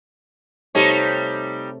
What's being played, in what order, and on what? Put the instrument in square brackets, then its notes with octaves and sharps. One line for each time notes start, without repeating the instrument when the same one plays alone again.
[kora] C3 A3 C#5 [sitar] G3 D#4